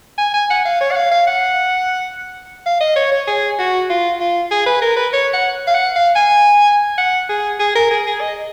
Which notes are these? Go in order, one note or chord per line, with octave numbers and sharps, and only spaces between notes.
G#5
G#5
F#5
F5
C#5
F#5
F5
F5
F#5
F5
D#5
C#5
C#5
G#4
F#4
F4
F4
G#4
B4
A#4
B4
C#5
F#5
F5
F#5
F5
G#5
F#5
G#4
G#4
A#4
G#4
G#4
D#5